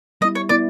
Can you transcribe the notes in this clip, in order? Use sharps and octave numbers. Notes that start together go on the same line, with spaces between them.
G3 B3 E4 D#5
C#5
G3 B3 E4 D5